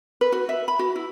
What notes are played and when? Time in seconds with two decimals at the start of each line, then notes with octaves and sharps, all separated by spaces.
0.21 B4
0.32 F#4
0.49 E5
0.68 B5
0.79 F#4
0.96 E4